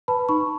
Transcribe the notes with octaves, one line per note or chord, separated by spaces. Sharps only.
B4 A5 B5
D#4 B5 C#6